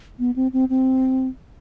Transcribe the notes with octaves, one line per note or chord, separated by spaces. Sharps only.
B3
C4
C4
C4